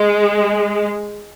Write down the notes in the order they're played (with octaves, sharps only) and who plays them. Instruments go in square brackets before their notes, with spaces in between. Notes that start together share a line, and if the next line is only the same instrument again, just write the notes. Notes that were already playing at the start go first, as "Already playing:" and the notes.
Already playing: [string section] G#3